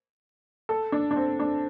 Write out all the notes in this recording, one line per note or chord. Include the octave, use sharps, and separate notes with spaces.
A4
D4
D4
C4
D4